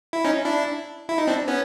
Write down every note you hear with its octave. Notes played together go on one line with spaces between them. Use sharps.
E4
C#4 D#4
D4 E4
E4
D#4
C4 D4
B3 C#4